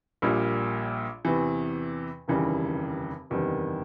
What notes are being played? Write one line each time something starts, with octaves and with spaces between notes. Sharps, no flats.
A#1 A#2 G3
E2 C3 E3
F1 D#2 C#3 E3 G3
F#1 E2 C3 D#3 G3